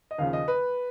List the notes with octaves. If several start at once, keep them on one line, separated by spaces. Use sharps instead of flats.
D#5
D#2 C#3 F3 F5
D#5
B4